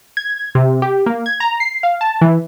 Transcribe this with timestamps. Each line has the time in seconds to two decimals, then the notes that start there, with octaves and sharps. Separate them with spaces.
0.17 G#6
0.55 C3
0.82 G4
1.06 A#3
1.26 G#6
1.40 A#5
1.60 C7
1.83 F5
2.01 A5
2.21 E3